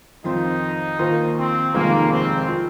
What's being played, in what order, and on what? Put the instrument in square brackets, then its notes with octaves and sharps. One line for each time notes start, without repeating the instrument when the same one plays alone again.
[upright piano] F2 D#3 C4 F4 C5 [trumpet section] D#4
[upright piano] D#2 D#3 A#3 F4 C5
[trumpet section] C4
[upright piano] F1 D#2 D#3 G#3 F4 [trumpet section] A#3
[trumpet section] C4
[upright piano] F3